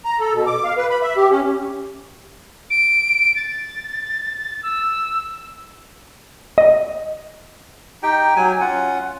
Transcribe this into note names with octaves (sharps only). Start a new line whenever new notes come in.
A#5
A4
B2
D6
F5
B4
B5
E5
G4
C#4
D7
A6
E6
D#5
D#4 G4 G5
F#3 G#5
C#4 F4 F#5